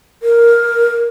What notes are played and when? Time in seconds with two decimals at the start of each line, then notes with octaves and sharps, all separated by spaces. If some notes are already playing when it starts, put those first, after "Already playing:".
0.23 A#4